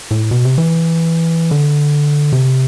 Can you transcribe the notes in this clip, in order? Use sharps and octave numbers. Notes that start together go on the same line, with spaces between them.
A2
B2
C3
E3
D3
C3